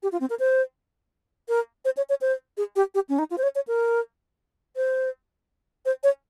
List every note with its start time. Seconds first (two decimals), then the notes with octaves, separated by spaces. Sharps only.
0.03 G4
0.12 F4
0.20 C4
0.30 A#4
0.39 C5
1.49 A#4
1.85 C5
1.97 C#5
2.09 C#5
2.21 C5
2.57 G#4
2.76 G4
2.94 G4
3.09 C#4
3.19 D#4
3.31 F4
3.38 C5
3.43 C#5
3.55 C#5
3.67 A#4
4.76 C5
5.85 C5
6.03 C#5